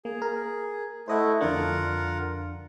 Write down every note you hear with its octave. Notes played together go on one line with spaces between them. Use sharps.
A#3 G#4
A#4
A3 E4 C5 D#5 F#5
F2 D3 D4 F4 A#4 F#5